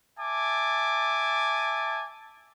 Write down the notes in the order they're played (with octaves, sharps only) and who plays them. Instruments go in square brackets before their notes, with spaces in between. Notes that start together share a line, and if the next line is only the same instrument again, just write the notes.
[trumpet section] E5 G#5 A5 D6